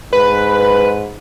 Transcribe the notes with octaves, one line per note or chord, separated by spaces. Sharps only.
G#2 B4